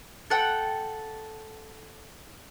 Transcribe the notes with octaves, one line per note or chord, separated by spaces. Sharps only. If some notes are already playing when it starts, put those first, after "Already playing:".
A4 F#5 G5